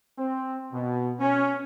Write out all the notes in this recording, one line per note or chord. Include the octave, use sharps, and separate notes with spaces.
C4
B2
C#4